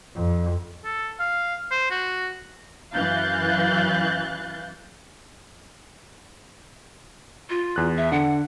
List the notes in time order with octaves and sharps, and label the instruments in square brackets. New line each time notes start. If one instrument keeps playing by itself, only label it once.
[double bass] F2
[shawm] A4
F5
C5
F#4
[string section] F#2 E3 F5 F#6 G6 A6
[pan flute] F4
[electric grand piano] E2 F#6
[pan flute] E5
[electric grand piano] D3 [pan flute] F#5